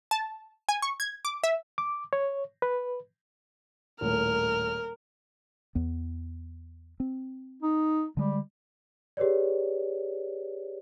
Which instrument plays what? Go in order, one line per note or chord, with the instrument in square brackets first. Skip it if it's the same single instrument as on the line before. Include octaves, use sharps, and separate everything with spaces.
[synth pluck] A5
G#5
C#6
G#6
D6
E5
[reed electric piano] D6
C#5
B4
[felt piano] D#1 A2 [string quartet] A#4 [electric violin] F6
[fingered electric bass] E2 B3
C4
[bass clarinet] D#4
[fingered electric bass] D3 G#3 [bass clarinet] G3
[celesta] G4 G#4 B4 C#5 D5